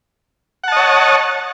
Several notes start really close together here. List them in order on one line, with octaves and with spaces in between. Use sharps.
F#5 A5 D#5 C#5